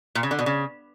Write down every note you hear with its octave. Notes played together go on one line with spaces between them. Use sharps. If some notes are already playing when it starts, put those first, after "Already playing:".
A#2
C#3
D3
B2
C#3